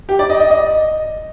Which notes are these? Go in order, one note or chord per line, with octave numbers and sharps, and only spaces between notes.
G4
D5
D#5
D#5
D#5